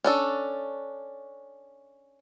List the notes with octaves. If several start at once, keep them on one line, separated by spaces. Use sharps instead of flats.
C#4 D4 A4